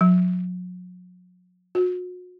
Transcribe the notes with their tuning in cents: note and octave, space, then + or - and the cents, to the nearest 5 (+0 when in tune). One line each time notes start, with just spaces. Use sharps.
F#3 -40
F#4 -40